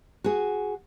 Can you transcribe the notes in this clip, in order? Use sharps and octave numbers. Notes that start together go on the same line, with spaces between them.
F#4 G#4